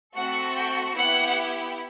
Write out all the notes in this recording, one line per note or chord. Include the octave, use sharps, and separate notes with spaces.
A3 C4 F#4 A4 F#5
G5
B3 E4 G4 F#5